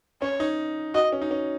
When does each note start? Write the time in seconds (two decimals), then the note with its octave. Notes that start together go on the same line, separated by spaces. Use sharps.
0.22 C#4 C#5
0.40 D#4
0.94 F#4 D#5
1.12 C#4
1.22 D#4
1.31 C#4